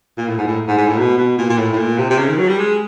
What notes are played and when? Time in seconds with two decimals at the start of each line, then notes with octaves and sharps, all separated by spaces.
0.17 A#2
0.28 A2
0.38 G#2
0.47 A2
0.68 G#2
0.78 G#2
0.88 A2
0.98 B2
1.18 B2
1.38 A#2
1.49 A#2
1.58 A2
1.72 A2
1.78 A#2
1.98 C3
2.10 C3
2.18 C#3
2.28 D#3
2.38 F#3
2.48 G3
2.58 G#3